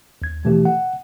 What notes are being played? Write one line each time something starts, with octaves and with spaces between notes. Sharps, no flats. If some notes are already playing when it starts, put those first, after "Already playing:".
D#2 G#6
B2 E3 F3 A3 G4
F#5